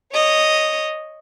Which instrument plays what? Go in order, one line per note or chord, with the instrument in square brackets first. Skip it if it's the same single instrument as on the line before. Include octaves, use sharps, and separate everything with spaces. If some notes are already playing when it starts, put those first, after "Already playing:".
[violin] C#5 D#5